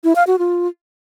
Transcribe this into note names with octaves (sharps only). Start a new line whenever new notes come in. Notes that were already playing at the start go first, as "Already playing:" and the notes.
E4
F5
F#4
F4